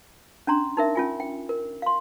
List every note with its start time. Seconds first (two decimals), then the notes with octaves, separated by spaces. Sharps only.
0.47 C#4 D4 A#5 C6
0.77 D#4 A#4 E5
0.95 C#4 F4 G#5
1.20 G5
1.49 A#4
1.82 F5 C6